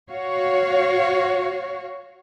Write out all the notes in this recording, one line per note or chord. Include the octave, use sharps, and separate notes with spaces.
F#4 C#5 F5